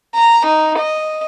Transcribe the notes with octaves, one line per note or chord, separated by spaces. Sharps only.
A#5
D#4
D#5